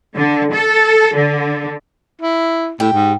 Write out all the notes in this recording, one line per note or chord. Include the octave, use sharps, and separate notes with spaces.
D3
A4
D3
E4
A2 G4
G#2